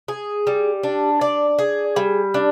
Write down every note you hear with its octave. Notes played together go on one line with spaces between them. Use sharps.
G#4
G3
D4
D5
G#4
G3
D4